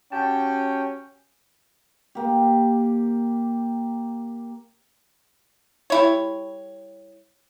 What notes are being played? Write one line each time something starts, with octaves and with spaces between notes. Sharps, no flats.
C#4 F#4 G4 G5 A5
A#3 G4
G3 E4 C#5